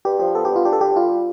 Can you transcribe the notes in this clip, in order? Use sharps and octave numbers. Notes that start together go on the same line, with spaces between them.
G2 G4
F3 G4
B3 A4
G4
G2
F4
D4 G4
A4
D3 G4
G3 F4